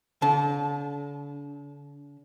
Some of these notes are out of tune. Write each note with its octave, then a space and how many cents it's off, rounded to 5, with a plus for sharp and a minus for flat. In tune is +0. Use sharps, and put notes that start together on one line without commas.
D3 -45 A5 -20